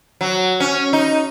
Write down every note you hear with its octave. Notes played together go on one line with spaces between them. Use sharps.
F#3
C#4
D#4